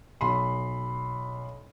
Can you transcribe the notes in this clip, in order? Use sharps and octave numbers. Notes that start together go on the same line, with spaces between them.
B1 B5 C6